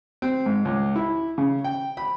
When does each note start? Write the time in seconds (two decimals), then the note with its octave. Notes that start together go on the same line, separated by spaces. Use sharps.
0.22 C4
0.46 G#2
0.65 C#2
0.96 E4
1.38 C#3
1.64 G5
1.97 B5